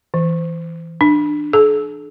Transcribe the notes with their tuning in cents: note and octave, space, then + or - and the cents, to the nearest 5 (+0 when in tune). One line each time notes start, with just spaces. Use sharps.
E3 -5
D4 +20
A4 -45